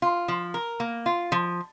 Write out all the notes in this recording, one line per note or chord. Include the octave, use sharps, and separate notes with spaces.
F4
F3
A#4
A#3
F4
F3